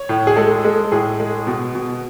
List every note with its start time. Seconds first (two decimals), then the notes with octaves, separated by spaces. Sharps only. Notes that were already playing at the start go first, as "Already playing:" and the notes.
Already playing: C#5
0.09 A2
0.27 G#4
0.36 G#3 A4
0.65 G#3
0.92 A2 G#4
1.20 G#3
1.47 B2
1.75 B2